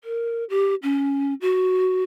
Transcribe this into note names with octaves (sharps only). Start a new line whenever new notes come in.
A#4
G4
C#4
F#4